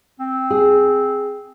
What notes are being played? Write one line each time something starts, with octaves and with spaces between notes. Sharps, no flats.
C4
G#4